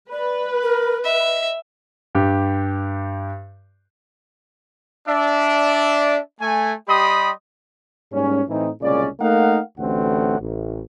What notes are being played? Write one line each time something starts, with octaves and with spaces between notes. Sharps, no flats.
B4 D5
A#4
D#5 E5
G2 G4
D4 D5 E5
A3 G#5
G3 G4 D#5 B5 C6 D#6
G#2 G3 A#3 C#4
A2 E3 C4 D#4
C2 A#2 C#3 G#3 C#4 D5
A3 A#3 D#4 A#4 F5 F#5
A1 D2 A2 D3 C4 F#5
A1